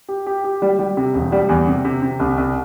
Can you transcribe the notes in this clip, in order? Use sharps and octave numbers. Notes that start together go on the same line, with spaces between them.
G4
G4
G4
G3
G3
C3
E1
G3
E2
C3
C3
C3
C2
C2